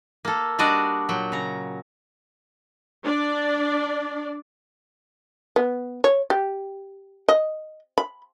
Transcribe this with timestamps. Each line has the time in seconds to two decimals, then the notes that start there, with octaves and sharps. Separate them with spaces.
0.25 A#3 A4
0.59 G3 D4 F#4 D5 D#5
1.09 A#2 F#3 G5
1.32 C#3 A#5
3.04 D4 D5
5.56 B3
6.04 C#5
6.30 G4
7.29 D#5
7.98 B5